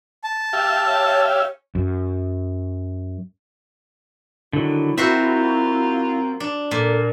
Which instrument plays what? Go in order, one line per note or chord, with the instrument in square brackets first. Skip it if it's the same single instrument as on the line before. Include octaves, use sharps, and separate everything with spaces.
[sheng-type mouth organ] A5
[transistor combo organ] G4 E5 F5
[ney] C#5
[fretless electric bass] F#2
[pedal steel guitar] D3 D#3 F#3 [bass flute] E4
[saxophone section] F#3 A#3 F4 [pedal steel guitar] C4 [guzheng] F#4 C5 E5
[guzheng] D4
[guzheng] A#2 [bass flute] A4